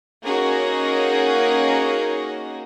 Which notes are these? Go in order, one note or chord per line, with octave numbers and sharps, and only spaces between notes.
A#3 C#4 D#4 F#4 G#4 A#4